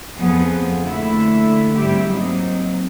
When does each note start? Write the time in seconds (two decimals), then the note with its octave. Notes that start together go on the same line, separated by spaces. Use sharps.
0.18 F2 F3 B3 G#4
0.81 D3 A3 A#3 E4
1.76 G#2 G3 C4 E4 G4 E5
2.06 F#3 A#3 C4 D#4